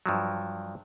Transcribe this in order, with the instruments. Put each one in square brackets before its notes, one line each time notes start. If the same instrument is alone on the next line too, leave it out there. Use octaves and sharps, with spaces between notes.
[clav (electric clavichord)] G2 F3 F#3